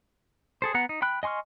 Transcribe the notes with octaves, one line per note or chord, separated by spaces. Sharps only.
G#4 A4 C5
B3 F#5 A#5
D#4
G5 B5 F#6
D#5 G#5 C6 C#6 F6